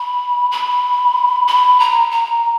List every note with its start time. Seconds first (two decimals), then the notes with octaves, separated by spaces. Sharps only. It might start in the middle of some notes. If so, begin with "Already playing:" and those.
Already playing: B5
0.51 B5
1.48 B5
1.80 A#5
2.11 A#5